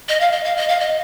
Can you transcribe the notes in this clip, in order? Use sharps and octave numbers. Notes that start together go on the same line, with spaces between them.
D#5
F5
D#5
F5
D#5
F5
D#5